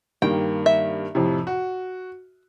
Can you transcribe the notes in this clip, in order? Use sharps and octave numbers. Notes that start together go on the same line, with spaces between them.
G2 D#3 A#3 G5
E5
F2 A2 C3
F#4